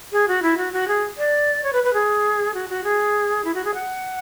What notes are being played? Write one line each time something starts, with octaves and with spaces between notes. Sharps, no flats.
G#4
F#4
E4
F#4
F#4
G#4
D5
C#5
B4
B4
G#4
F#4
F#4
G#4
E4
F#4
G#4
F#5